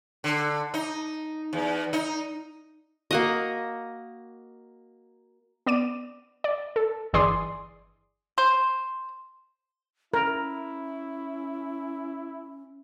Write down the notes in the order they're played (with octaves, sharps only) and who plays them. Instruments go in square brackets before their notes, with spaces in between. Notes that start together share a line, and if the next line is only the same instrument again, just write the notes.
[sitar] D3
D#4
E2
D#4
[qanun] A#3 F#4 D#5
[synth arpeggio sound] B3 D5 D6 D#7
D5
A4
G1 E3 G#4 D5 C6 D#6
[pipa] C5
[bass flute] C#4 [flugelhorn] E4 [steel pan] A#4